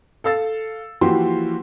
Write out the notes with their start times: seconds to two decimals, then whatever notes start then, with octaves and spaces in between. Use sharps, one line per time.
0.24 A4 F5 E6 A6
1.01 E3 F3 A#3 F#4 G4 C6